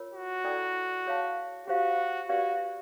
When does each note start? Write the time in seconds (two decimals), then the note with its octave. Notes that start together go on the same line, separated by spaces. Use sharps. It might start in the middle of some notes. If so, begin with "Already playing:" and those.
Already playing: F4 A#4 C#5
0.14 F#4
0.44 E4 A4 D5 G5
1.07 G#4 C#5 F5 A5
1.67 F#4 G4 C5 F5
2.29 F#4 G4 B4 D5 F5